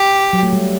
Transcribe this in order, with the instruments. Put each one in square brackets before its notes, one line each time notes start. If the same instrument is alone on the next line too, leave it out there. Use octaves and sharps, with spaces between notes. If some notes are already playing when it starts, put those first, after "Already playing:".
Already playing: [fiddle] G4
[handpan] F#3
A3
G3